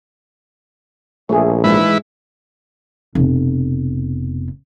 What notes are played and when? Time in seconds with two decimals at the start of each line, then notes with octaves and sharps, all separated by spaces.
1.29 A#1 A3 G#4
1.64 G#2 E3 G#3 E4 B4
3.15 F1 B2